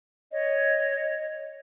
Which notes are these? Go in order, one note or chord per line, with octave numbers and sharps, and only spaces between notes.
C#5 D#5